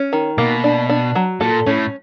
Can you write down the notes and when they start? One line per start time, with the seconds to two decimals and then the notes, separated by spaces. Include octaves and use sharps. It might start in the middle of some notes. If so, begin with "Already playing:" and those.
Already playing: C#4
0.13 D#3
0.38 B2 A#3
0.64 D4
0.89 D4
1.15 F#3
1.40 A#2 A4
1.66 A2 C#4